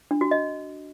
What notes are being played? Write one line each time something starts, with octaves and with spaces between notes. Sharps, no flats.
D4
F#4
D#5